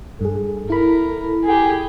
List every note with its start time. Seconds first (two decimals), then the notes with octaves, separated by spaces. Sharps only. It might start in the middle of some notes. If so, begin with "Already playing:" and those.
0.21 G2 G#4 A4
0.70 E4 A#4 B5
1.44 G4 G#4